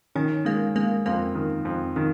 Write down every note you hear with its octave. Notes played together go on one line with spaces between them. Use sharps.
D#3 C#4
G#3 A#3
G#3 A#3
F2 A#3
D#3
F2
D#3